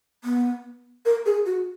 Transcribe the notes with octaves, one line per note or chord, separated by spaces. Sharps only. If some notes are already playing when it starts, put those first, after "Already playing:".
B3
A#4
G#4
F#4